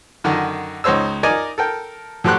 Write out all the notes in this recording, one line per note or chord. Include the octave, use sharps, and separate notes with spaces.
F#2 D3 D#3
C#2 D#4 C5 C#5 E6
D#4 A#4 D5 D#5 G#5 D6
A4 A#4 G5
A2 F#3 G4 A4 C6 F#6